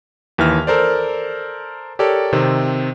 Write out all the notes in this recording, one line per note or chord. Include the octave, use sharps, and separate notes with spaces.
D#2 E3 E5 F6
A4 A#4 C5 D5
G4 A4 A#4 C#5 D5
C3 D#3 C4